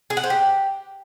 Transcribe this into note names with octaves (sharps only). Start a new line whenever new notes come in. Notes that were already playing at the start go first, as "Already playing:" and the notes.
G#4
F#5
C5
G4